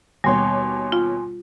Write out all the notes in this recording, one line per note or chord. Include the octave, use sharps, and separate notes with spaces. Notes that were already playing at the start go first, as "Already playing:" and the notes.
D#2 B2 G3 C#5 G#5 C6
F4